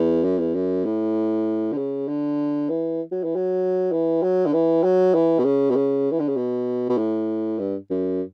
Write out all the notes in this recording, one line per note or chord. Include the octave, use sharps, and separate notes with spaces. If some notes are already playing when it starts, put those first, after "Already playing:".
Already playing: E2
F#2
E2
F#2
A2
D3
C#3
D3
E3
F#3
E3
F#3
E3
F#3
D3
E3
F#3
E3
B2
C#3
B2
C#3
E3
D3
C#3
B2
B2
A2
G2
F#2